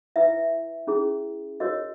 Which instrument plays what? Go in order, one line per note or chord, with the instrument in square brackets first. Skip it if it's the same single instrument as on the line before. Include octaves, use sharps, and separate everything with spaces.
[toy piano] E4 B4 E5
C#4 E4 G#4
F#4 A#4 C#5 D#5